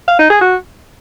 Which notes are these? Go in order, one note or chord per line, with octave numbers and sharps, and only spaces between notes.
F5
D#4
G#4
F#4